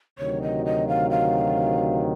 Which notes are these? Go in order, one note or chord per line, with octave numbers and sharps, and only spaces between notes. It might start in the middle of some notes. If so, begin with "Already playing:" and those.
D2 C3 D#3 F#3 C#5
D#5
D#5
F5
F5